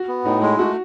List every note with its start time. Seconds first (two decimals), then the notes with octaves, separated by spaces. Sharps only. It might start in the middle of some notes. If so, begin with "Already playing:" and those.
Already playing: F#4
0.08 B3
0.25 A2 D#4
0.42 G#3 E4
0.59 A3 F#4